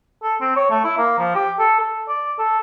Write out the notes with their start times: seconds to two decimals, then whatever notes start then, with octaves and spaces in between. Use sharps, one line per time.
0.23 A4
0.41 C4
0.57 C#5
0.71 A3
0.84 E4
0.98 A#3
1.19 F3
1.35 G4
1.59 A4
1.80 A4
2.08 D5
2.39 A4